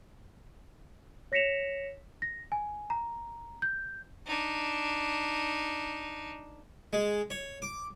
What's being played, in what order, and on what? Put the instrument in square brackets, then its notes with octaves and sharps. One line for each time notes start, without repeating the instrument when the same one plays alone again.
[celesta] C#5 A#6 B6 C#7 E7 F7
A#6
G#5
A#5
G6
[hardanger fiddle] D4 D#4
[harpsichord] G#3
C#5
D6